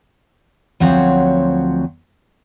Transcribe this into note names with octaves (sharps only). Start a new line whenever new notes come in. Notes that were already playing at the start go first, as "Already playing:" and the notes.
D2 F3 F#3 C4 C#5